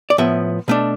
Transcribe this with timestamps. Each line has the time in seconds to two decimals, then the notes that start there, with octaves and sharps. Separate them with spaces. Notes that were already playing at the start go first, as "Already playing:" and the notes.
0.10 D5
0.18 A2 F3 B3 E5
0.68 B2 A3 D4